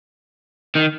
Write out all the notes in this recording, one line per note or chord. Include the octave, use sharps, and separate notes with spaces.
D#3